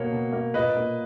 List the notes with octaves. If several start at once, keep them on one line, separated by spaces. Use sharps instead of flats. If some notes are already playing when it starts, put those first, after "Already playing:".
Already playing: B2 A#3 C#5
B2
A#3
A#2 B4 D#5
A#3